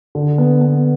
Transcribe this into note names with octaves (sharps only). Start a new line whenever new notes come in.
D3
B3
B3